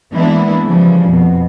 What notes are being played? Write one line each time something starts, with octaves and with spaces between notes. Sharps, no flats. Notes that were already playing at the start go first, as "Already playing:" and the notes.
E3 G#3 A#3 B3 D4 E4
C#3 E3 F3 G3
F2 B2